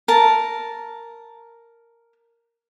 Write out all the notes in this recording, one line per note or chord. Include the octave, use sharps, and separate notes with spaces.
A#4 A5